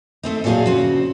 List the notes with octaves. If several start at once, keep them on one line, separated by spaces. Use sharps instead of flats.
A3 C4 D#4
E2 A#2 F#3 D4 G#4 F5
C#3 C4 F#4